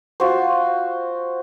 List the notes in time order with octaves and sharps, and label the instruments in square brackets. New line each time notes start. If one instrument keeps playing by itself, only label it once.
[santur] F4 F#4 C5